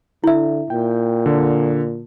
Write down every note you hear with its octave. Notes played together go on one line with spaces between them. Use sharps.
D3 E4 E5
A#2 G5
D3